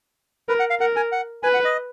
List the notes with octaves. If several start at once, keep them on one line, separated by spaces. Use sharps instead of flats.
A#4 B4
F#5
F5
A#4 F#5
G#5
F#5
B4 G#5
F#5
D#5